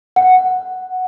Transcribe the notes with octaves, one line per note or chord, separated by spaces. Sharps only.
F#5